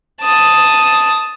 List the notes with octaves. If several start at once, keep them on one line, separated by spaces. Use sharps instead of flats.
A5 D#6